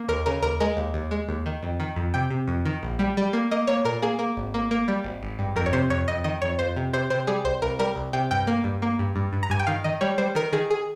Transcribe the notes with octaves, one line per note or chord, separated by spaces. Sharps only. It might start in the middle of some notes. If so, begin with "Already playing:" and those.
Already playing: A#3
D#2 A#4
C#3 A#4
D#2 A#4
G#3 A#4
D#2
D#2
G#3
D#2
D#3
F2
D#3
F2
C3 G5
C3
F2
D#3
A#1
G3
G3
A#3
A#3 D#5
A#3 C#5
A#2 A#4
A#3 G#4
A#3
G#1
A#3
A#3
G3
G#1
G#1
G2
F2 A#4
C#5
C3 C5
F2 C#5
F2 D#5
D#3 D#5
F2 C#5
F2 C5
C3
C3 C5
C3 C5
G3 G#4
C2 C5
C2 A#4
G3 A#4
C2
C3 G5
G2 G5
A#3
G2
A#3
G2
G2
G2
A#5
G2 G#5
G5
D#3 F5
D#3 D#5
G3 C#5
G3 C5
D#3 A#4
D#3 G#4
G#4